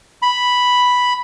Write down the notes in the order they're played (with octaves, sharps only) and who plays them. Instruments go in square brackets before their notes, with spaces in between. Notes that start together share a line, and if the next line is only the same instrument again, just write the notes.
[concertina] B5